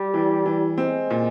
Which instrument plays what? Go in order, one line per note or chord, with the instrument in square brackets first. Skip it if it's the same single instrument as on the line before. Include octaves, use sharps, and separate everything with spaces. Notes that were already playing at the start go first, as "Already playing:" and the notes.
Already playing: [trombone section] G3
[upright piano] E3
E3
[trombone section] G#3 [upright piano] C4
[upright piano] A#2